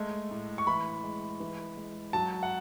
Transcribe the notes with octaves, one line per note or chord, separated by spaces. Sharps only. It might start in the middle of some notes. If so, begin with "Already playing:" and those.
Already playing: G#3 A3
A2
C#6
E3 B5
G#3
E3
G#3
F#3 A5
F#5